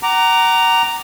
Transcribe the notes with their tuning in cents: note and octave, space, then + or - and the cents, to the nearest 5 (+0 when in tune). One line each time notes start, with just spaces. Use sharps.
F#5 +30 A#5 +0 D6 +0